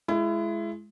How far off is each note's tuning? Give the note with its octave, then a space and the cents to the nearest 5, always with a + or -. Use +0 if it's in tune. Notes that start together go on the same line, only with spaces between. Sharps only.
G#3 +20 E4 +30